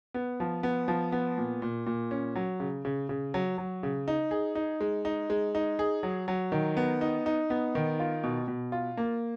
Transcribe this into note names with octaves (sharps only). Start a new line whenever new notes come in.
B3
F3
B3
F3
B3
A#2
A#2
A#2
C#4
F#3
C#3
C#3
C#3
F#3
F#3
C#3
D#4
G#4
D#4
G#3
D#4
G#3
D#4
G#4
F#3
F#3
D#3
B3
D#4
D#4
B3
D#3
F4
B2
B2
F4
A#3